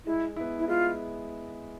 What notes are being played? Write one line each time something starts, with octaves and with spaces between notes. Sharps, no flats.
G#3 E4
B3 E4
E4
G#3 F4